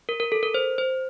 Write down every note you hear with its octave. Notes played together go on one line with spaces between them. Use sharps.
A#4
A#4
A4
A#4
C5
C5